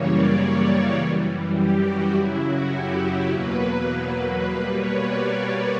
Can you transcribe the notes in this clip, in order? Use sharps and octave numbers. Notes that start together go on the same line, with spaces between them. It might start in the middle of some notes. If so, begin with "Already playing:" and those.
Already playing: F#2 C#3 E3 G3 A#3 C#5
D5
C#5
F#2 E3 G3
G4
F#4
F#2 C#3 F#3 E4
F#4
G4
E2 B2 F#3 A#3 B4
B4
B2 G3 A#3
C#5
D5